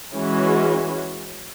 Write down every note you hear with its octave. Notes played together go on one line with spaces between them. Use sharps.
E3 G#3 C#4 F#4